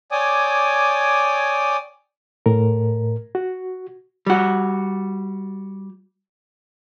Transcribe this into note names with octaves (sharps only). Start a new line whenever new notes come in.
C#5 D5 G5 G#5 D6 D#6
A2 A#4
F#4
G3 F#4